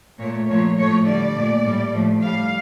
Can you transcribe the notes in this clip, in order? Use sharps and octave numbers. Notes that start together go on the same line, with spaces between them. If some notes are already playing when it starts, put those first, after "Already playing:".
A#2 A3 C#5
A#2 F3 A3 C#5
A2 F3 A3 C#5
D3 G3 D5
A#2 A3
A2 G3
A2 F3 A3
A2 G3 F5